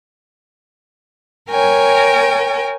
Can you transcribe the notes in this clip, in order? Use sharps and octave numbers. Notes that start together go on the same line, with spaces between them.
A#4 C#5 G5 G#5